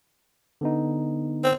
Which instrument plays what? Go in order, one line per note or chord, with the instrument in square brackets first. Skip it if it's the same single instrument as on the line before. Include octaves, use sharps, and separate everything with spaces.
[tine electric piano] D3 B3 D#4
[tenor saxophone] C4